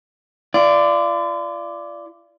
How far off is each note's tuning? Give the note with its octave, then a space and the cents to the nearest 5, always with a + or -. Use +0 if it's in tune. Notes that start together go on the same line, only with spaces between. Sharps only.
F4 -40 D5 +0